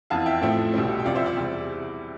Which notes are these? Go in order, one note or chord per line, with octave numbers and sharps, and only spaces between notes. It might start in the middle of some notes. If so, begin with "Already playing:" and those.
F2 E3 B3 F5 A5
E5 G5
A2 F3 A3 C4 E5 G5
C2 B2 G3 C4
G5
C2 C3 F3 D5 F5
C5 E5
D5
E2 C3 G3